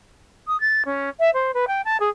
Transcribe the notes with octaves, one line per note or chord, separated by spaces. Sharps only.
D#6
A6
C#4
E5
C5
B4
G5
A5
G#4